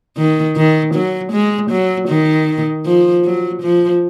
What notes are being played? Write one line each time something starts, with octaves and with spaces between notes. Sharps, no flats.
D#3
D#3
F#3
G#3
F#3
D#3
F3
F#3
F3